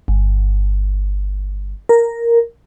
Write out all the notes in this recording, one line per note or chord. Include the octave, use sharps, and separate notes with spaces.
G1
A#4